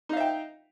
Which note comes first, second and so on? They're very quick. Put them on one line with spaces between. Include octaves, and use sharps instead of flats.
D#4 F5 E5 G5